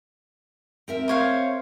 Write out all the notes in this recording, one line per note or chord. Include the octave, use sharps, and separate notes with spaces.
C4 A#4 E5
C5 C#5 F5